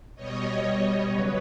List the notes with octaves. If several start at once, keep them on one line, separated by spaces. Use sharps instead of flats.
B2 G3 C#5 D#5
C#3 F#3 B4 C#5